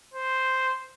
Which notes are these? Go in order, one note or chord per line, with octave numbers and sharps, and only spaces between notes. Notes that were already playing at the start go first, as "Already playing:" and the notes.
C5